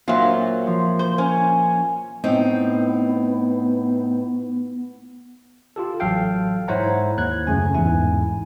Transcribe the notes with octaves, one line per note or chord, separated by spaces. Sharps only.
A#2 F#3 F4 C5 E5
F3
C5
C#4 G#5
A2 B3 C4 D#4
F4 G4 A4
A1 F#3 A4 F5 G5
G#2 E4 C5 C#5 F#5 A#5
D#2 F#6 G#6
F#2 C#3 A3 C#4 G#5
A1 E2 G#2 E4 G#5